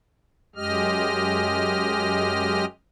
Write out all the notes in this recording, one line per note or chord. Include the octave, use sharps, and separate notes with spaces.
F#2 G#3 G4 D#5 F6